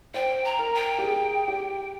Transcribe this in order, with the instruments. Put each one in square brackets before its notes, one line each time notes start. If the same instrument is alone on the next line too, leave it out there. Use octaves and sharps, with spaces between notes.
[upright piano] C5 [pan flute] G5
[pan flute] A#5
[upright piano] A#4
[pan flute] G5
[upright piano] G4
G#4
G4